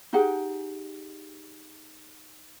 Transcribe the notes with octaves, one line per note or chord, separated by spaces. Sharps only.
D#4 G4 G#4 F#5